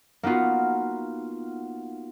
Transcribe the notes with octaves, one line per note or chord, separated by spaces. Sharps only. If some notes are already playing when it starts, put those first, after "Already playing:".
A#3 B3 D#4 F4 F#4